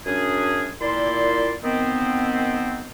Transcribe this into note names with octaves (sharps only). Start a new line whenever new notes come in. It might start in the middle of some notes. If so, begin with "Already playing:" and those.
F#2 C#4 D4 G#4
A#2 E4 D5 C6
D#3 B3 C4